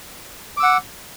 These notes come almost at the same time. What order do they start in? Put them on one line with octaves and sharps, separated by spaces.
D6 E6 F#5